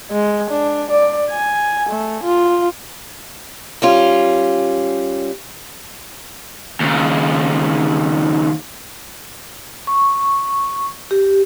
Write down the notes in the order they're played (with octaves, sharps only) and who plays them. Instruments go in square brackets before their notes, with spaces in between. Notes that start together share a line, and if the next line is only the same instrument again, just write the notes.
[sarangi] G#3
D4
D5
G#5
A3
F4
[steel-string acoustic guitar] G3 C#4 F4
[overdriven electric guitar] D#2 C#3
[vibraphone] C#6
G4